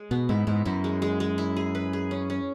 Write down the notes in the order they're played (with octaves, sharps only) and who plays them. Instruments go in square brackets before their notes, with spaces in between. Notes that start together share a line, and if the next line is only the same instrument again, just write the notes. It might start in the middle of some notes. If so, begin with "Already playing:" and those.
Already playing: [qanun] G#3
[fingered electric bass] B2 [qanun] B3
[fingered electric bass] G#2 [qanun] E4
[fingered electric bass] G#2 [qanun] E4
[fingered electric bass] F#2 [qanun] E4
[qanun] G#3
G#3
G#3
E4
G#4
B4
G#4
C#4
C#4